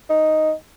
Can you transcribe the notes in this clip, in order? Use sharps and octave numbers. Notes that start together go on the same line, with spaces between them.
D#4